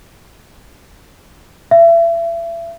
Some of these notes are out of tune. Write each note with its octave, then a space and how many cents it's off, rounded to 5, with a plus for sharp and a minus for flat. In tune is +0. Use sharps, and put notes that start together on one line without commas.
E5 +35